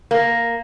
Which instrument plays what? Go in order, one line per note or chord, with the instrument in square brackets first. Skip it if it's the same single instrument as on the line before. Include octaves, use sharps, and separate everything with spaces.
[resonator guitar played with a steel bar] A#3